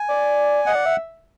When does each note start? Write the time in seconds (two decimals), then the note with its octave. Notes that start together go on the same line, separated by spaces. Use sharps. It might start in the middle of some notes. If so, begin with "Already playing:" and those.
Already playing: G#5
0.08 D5
0.66 D#5 F#5
0.75 D5
0.86 E5